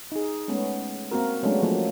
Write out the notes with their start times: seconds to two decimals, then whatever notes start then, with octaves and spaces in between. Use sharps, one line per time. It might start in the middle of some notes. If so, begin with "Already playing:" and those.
0.12 D#4 G#4
0.48 G#3 A3 B3 C#4
1.11 A#3 C4 F#4 A#4
1.43 F#3 G#3 A3 B3 C#4 D4
1.62 F3 F#3 A3 A#3